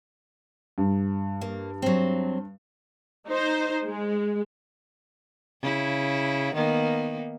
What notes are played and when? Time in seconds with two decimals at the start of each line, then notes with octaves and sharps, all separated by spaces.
0.78 G2
1.41 A#3
1.82 F#3 C4
3.28 D#4 C5
3.84 G#3
5.61 C#3 E4
6.55 D#3 A#3 B3